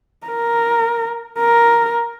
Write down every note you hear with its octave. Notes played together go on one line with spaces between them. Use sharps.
A#4
A#4